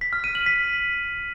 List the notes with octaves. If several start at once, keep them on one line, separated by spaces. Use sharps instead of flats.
B6
F6
D#7
F#7
B6